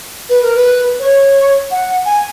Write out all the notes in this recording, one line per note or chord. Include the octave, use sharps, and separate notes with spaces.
B4
A#4
B4
C#5
F#5
G#5